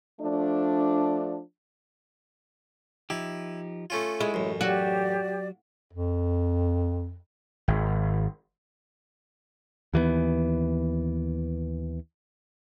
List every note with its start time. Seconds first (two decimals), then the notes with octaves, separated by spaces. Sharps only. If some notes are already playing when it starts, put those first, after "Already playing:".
0.21 F3 A3 D4
3.10 F3 D#4 E4 G4
3.90 A3 C#4 F4
4.21 G#3 E4
4.34 A1 F#2
4.61 F#3 F#4 G4 D5
5.93 F2
7.68 G#1
9.94 D#2 E3 G3 B3